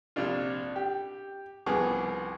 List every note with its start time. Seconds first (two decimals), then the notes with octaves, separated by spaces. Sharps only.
0.16 A#1 C3 D4 F4
0.76 G4
1.66 C2 F3 B3 G#4 D6